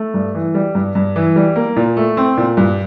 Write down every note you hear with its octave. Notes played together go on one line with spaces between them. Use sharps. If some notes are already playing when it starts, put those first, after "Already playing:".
Already playing: A3
G2
E3
G3
G2
G2
E3
G3
A#3
A#2
A3
C4
A#2
G2